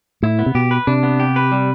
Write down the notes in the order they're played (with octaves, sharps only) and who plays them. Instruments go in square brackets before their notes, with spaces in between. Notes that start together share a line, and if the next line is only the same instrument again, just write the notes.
[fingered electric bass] A2 [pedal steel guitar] E4
[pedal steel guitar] B3
[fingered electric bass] C3
[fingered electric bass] B2 [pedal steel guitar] G4
[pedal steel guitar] B4
[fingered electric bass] C3 [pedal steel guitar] D4
[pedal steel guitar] B3
G4
B4
G3